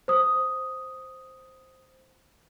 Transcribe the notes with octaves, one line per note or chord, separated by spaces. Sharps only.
C5 D#6